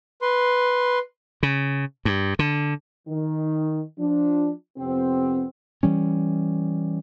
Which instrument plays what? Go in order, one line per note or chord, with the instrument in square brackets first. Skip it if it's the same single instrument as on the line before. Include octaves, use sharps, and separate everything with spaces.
[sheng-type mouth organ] B4 C6
[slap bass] C#3
G2
D3
[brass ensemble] D#3
F3 D4
F2 C3 B3 C4
[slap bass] E3 G3 C#4